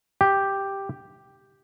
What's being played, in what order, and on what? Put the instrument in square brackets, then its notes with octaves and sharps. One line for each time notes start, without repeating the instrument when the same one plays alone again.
[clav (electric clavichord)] G4